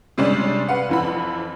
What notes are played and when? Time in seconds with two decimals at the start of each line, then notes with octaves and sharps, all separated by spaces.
0.18 C3 G3 G#3 C#4 D4
0.69 B4 F5 F#5
0.89 F2 E3 B5